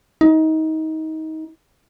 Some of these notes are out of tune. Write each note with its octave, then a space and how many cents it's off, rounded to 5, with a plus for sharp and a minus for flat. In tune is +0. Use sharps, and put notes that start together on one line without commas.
D#4 +25